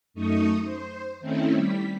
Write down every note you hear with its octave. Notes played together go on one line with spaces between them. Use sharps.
F#2 A3 D#4 C#6 D#6
C5
D#3 A3 C4 C#4 E4
G3 B6